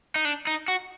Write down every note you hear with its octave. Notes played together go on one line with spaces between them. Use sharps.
D#4
D4
D#4
F#4